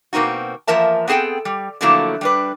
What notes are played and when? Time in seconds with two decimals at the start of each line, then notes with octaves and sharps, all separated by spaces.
0.13 B2 A#3 C4 D#4 F#4
0.67 E2 F3 A#3 A#4 E5 A5
1.08 B3 C4 G#4 A4 G5
1.45 G3
1.81 D3 F3 F#3 A3 A#3 E4
2.21 G3 D4 B4